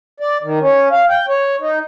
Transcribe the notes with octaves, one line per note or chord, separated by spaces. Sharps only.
D5
D#3
C#4
F5
G5
C#5
D#4